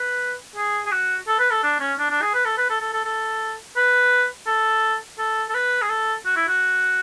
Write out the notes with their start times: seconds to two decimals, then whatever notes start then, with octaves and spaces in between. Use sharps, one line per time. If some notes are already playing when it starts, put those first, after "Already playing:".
Already playing: B4
0.56 G#4
0.86 G#4
0.92 F#4
1.27 A4
1.39 B4
1.51 A4
1.63 D4
1.80 C#4
1.99 D4
2.10 D4
2.22 G#4
2.34 B4
2.45 A4
2.57 B4
2.70 A4
2.81 A4
2.93 A4
3.05 A4
3.76 B4
4.47 A4
5.19 A4
5.49 A4
5.54 B4
5.82 G#4
5.89 A4
6.25 F#4
6.36 E4
6.48 F#4